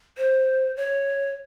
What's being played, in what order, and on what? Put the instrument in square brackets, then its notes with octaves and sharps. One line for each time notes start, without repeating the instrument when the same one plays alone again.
[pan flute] C5
C#5